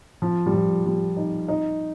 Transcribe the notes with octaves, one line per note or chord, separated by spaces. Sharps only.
F3
G3
F3
G3
D#4
D#4